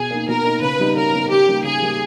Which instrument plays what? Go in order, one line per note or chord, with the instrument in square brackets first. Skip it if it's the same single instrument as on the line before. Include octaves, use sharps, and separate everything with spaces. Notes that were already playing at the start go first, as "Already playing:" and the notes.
Already playing: [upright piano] B2 [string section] G#4
[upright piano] A#3 D#4
[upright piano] B2 [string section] A#4
[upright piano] A#3 D#4
[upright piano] C#3 [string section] B4
[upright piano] G3 B3 D#4
[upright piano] C#3 [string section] A#4
[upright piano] G3 B3 D#4
[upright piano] C#3 [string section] G4
[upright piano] G3 A#3 D#4
[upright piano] C#3 [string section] G#4
[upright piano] G3 A#3 D#4